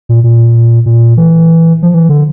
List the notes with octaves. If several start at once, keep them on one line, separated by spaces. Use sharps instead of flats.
A#2
A#2
A#2
E3
F3
E3
D3